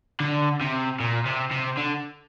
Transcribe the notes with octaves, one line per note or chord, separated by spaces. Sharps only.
D3
C3
A#2
C3
C3
D3